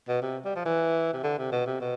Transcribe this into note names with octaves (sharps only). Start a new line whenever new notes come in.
B2
C3
G3
F3
E3
C3
D3
C3
B2
C3
B2